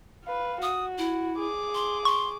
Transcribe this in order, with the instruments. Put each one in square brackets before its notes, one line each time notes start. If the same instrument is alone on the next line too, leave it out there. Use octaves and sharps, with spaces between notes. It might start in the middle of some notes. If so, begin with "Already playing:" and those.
[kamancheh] B4 F5
[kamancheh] F#4 [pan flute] D#6
[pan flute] E4
[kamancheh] G#4 D6
[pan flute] C6
[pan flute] C6 [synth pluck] C#6